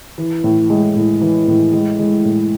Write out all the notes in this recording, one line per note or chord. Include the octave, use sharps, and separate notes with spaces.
E3
A2
G#3
A2
E3
A2
G#3
G#3
A2